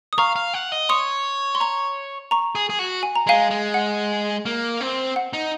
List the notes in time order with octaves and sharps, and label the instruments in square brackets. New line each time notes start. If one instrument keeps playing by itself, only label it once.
[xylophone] D#6
[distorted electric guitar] F5 [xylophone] A#5 C#6
[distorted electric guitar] F5
F#5
D#5
[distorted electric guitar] C#5 [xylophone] C6 D#6
[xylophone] C6
A#5 C#6
A#5 C#6
[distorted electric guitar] G#4
G#4
F#4
[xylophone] G#5
A#5
[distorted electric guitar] G#3 [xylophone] F5 G#5
[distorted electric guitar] G#3
[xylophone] F#5
[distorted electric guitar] A#3
C4
[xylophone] F#5
[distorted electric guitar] D#4